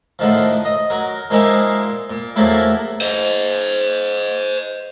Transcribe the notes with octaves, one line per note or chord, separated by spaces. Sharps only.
A2 D3 D#3 F3
D#5
F#3 A#4
A#2 F3 G#3 A#3 D#4 E4
A#2
E2 F3 F#3 A3 A#3 E4
C5 D#5